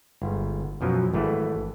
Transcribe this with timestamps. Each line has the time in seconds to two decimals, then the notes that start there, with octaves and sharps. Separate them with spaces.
0.22 G1 G#2
0.81 F#2 B2 F3 F#3
1.14 G#1 E3 A3 B4